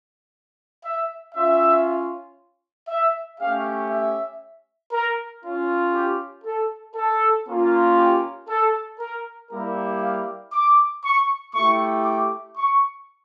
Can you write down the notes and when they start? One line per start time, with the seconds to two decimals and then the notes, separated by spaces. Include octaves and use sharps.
0.84 E5
1.35 C#4 F4 E5
2.88 E5
3.39 A3 C#4 G4 F5
3.90 E5
4.92 A#4
5.43 C#4 F4
5.94 G4
6.45 A4
6.95 A4
7.47 A#3 C#4 F4
7.97 G4
8.49 A4
8.99 A#4
9.51 G3 A#3 E4 G4 A#4
10.02 F5
10.53 D6
11.03 C#6
11.54 A3 E4 G4 C#6
12.05 D6
12.57 C#6